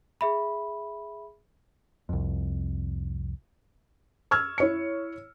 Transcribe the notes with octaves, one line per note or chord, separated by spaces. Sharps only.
G#4 E5 B5
C2 F2
C#6 E6 F6 G#6
E4 C#5 C#7